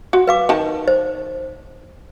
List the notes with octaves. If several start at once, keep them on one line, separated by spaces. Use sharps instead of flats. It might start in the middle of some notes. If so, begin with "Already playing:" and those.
F#4
B4 F5 D6
D#3 A5
C5